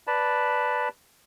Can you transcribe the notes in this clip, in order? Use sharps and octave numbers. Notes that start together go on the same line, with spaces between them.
B4 D5 A5 B5